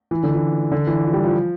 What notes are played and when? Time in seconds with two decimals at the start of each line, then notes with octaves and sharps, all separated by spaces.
0.11 E3
0.23 D3
0.35 E3
0.72 D3
0.87 E3
1.04 F3
1.13 G3
1.23 F3